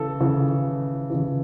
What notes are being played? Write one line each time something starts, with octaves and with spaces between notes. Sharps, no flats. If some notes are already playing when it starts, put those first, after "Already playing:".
Already playing: C#3 E3 A4
C#3 E3
C#3 E3